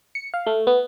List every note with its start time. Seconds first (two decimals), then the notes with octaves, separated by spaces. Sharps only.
0.15 C#7
0.34 F5
0.47 A3
0.67 B3